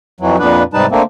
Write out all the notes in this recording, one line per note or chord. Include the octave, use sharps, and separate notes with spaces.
F2 E3 F#3
F2 A#2 B3 D4 B4
G#2 C3 G3 D#4 B4 A5
D3 A3 A#3 C4